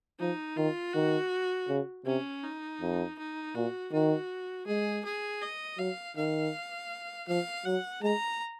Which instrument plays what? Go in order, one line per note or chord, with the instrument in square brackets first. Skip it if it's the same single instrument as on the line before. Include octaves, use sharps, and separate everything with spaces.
[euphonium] F3 [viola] D#4
[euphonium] D#3 [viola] F4
[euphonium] D#3 [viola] F#4
[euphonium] C#3
[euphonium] C3 [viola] C#4
[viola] D#4
[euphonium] F2
[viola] D#4
[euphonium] A#2 [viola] F#4
[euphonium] D#3 [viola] F#4
[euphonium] G#3 [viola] G#4
[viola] G#4
D#5
[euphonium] F#3 [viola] F5
[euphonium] D#3 [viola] F5
[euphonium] F3 [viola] F5
[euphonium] F#3 [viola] F#5
[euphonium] G#3 [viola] A#5